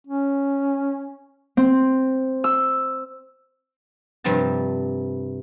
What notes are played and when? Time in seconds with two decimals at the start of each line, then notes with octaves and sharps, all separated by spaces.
0.07 C#4
1.57 C4
2.44 E6
4.24 G2 C3 F3 G3 D4 A5